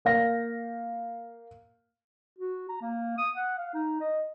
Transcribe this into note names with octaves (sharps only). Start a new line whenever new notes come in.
A#3 F5 A#6
F#4
A#5
A#3
D#6
F#5
F5
D#4
D#5